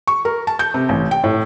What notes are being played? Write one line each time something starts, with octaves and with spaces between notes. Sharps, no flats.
C#6
A#4
A5
G6
C3
A1
G5
A2